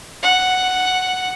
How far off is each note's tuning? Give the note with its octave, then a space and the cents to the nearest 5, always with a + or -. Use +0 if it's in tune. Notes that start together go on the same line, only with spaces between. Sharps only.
F#5 +0